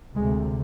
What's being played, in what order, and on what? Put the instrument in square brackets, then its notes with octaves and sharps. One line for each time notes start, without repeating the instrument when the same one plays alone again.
[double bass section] D2 C3 G#3